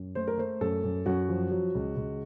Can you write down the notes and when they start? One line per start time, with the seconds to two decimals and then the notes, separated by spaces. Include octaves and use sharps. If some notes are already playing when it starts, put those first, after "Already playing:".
Already playing: F#2
0.15 A3 C5
0.27 A#4
0.38 A3 C5
0.61 F#2 A4
0.84 F#2
1.06 F#2 F#4
1.29 F3
1.51 F#3
1.75 C#2
1.97 C#2